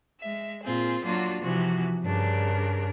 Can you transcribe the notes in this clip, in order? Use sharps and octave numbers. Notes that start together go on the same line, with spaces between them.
G#3 E5
A#2 C4 F4 G#4
F#3 A#3 D4 F4 F#4
C3 E3 F3 F#4
G2 C#3 D4 A#4